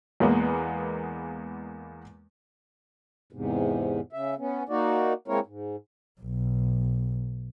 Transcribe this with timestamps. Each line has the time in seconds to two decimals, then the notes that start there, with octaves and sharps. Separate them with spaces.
0.20 E2 G#3 A#3 B3
3.33 E2 G#2 C3
4.13 C#3 E5
4.38 B3 C#4
4.69 A#3 D#4 F#4 D5
5.28 G#3 A#3 C4 E4 A#4 C#5
5.46 G#2
6.21 B1